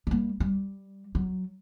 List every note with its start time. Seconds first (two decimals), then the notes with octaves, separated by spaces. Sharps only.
0.07 G3 A#3
0.40 G3
1.15 F#3